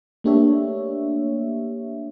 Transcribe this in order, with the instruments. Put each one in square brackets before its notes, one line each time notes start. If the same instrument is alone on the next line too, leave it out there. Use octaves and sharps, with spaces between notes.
[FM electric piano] A3 A#3 D4 G4 C#5 E5